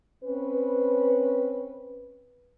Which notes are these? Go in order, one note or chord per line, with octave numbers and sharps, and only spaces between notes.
C4 C#4 B4